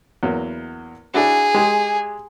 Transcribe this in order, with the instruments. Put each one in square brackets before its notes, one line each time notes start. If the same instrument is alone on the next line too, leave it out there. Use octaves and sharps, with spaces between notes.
[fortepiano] E2 F#3 A#3
[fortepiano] D4 E4 F#4 [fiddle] G#4
[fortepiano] G#3 G4